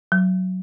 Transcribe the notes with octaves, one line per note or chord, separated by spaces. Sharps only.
F#3